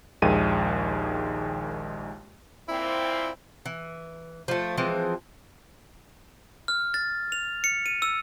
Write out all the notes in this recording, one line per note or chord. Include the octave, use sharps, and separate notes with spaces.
A#1 D#2 D#3 G#3 D#7
A#2 C4 E4
E3
F3 A3
E3 F3 G#3 C4
F6
A6
F7
C#7
D#7
E6